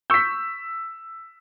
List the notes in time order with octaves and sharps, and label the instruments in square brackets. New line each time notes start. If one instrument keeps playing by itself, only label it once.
[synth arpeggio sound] C#6 G6 [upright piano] E6 B6